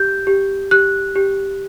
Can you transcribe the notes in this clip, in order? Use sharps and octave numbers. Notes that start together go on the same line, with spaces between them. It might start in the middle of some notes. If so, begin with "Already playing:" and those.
Already playing: G4 G6
G4
G4 F#6
G4